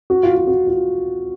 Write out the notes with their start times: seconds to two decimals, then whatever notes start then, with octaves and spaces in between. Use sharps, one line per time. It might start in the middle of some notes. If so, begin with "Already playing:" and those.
0.10 F#4
0.23 F4
0.35 F4
0.47 F#4
0.67 F4